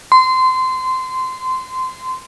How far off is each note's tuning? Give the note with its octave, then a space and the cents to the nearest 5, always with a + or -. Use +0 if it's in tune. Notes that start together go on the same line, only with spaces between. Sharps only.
C6 -20